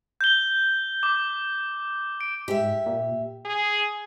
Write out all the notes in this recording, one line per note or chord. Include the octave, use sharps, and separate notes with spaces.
G6 G7
D6
D7
G#2 G4 E5
A#2
G#4